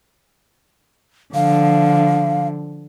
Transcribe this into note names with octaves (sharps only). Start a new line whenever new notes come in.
D3 F3 F5